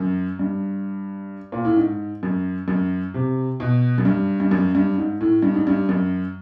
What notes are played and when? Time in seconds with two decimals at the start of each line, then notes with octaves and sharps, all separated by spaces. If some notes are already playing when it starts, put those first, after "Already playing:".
Already playing: F#2
0.39 G2
1.52 A#2
1.65 A2
1.77 G#2
2.23 F#2
2.68 F#2
3.14 C3
3.60 B2
3.98 F#2
4.05 G2
4.40 G2
4.51 F#2
4.75 G2
4.98 G#2
5.21 A2
5.43 G2
5.54 G#2
5.67 G2
5.89 F#2